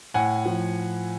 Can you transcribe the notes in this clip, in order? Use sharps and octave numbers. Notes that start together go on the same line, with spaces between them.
A2 F#5 G#5
F3